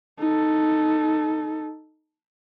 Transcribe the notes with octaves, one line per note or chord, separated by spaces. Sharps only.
D#4 A4